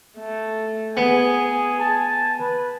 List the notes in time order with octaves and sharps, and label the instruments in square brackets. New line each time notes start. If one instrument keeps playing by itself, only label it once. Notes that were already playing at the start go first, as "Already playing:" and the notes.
[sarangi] A3
[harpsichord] B3 [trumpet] G#4 [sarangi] G#5
[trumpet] A5
B4